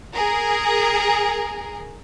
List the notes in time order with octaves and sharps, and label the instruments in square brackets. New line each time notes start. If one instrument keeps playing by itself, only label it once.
[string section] G#4 A#4